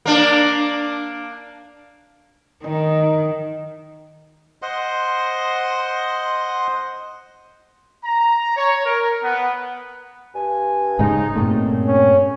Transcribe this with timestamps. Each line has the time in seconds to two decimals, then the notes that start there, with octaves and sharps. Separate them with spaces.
0.06 A#3 D4
2.64 D#3 D#4
4.62 C5 D#5 F#5 C6
8.04 A#5
8.57 C#5
8.86 A#4
9.24 B3
10.35 G2 G#5
10.99 G#2 C#3 G#3 D#4
11.35 G2 A#2 C#3 A3 C4
11.86 C#4